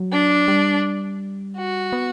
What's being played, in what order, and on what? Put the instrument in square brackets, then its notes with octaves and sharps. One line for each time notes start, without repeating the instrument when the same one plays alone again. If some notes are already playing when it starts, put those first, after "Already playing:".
Already playing: [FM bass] F#3
[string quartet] D4
[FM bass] G3
[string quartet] F#4
[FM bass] B3